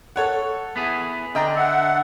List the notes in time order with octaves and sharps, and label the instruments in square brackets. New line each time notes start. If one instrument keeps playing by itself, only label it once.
[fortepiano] A4 C#5 F#5
[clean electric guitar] B3 E4 G#4
[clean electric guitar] D3 D4 [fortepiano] D#5 G5 A#5
[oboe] E5 [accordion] F#5